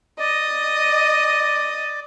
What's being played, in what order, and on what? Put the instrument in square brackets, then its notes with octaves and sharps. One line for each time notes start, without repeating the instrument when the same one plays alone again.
[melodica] D5 [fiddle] D#5